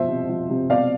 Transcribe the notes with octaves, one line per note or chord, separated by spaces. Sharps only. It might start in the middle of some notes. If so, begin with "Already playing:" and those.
Already playing: B2 F3 C5 E5
C3
F3
C3
B2 D5 F5